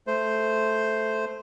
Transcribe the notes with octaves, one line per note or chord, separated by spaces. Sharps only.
A3 C5